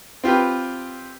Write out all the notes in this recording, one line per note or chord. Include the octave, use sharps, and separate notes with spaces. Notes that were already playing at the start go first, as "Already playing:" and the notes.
C4 F4 G4 B4